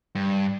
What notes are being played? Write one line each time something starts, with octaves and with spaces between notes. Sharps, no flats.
G2